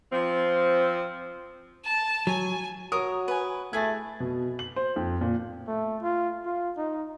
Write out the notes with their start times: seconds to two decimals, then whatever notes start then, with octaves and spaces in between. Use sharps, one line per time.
0.12 F3 C4
1.84 A5
2.27 F#3 G#5
2.92 F#4 A#4 C#5 C#6 D#6
3.28 B4 G#5
3.73 A3 E4 G#4 G#6 A6
4.20 B2
4.59 F#7
4.76 C5
4.96 F2
5.21 A#2
5.67 A3
6.02 F4
6.45 F4
6.77 D#4